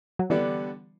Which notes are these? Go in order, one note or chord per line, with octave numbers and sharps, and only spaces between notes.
F#3
D3 E3 G3 B3 D4